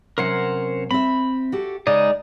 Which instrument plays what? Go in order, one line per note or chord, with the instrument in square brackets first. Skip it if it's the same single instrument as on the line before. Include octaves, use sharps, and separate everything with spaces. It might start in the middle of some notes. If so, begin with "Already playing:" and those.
[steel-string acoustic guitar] C3 F#3 C#4 [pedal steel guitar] A#4 C5 F#5
[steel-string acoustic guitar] C4 E5 [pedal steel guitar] B5
[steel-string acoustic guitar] F#4 G4 A4
[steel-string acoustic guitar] C#3 [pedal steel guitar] G#3 D#4 D#5 [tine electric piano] D5